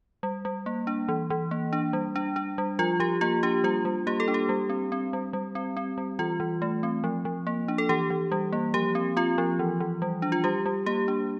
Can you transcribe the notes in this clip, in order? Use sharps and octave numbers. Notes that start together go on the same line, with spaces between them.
G3
G3
A#3
D4
E3
E3
A#3
D4
G3
D4
D4
G3
F3 F4
F3 G4
A#3 F4
D4 G4
G3 F4
G3
A#3 G4
A4
D4
G4
G3
C4
C4
G3
G3
C4
C4
G3
E3 F4
E3
A3
C4
F3
F3
A#3
D4
A4
E3 G4
E3
G3
A#3
F3 G4
C4
C4 F4
F3
E3
E3
G3
D4
F4
G3 G4
G3
A#3 G4
D4